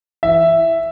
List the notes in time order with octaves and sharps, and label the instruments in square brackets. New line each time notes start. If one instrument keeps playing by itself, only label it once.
[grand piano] E3 E5